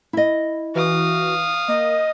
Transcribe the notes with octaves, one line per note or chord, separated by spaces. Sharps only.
E4 D#5
E3 F#4 F5 D#6
A#3 D#5